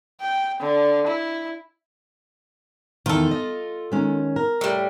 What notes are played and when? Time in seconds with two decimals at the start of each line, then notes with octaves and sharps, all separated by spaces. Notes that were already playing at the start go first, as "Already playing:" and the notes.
0.20 G5
0.60 D3
1.07 E4
3.06 E2 G#2 D#3 F4 A4
3.31 D#5
3.92 D#3 G#3 C#4
4.36 A#4
4.61 A2 G3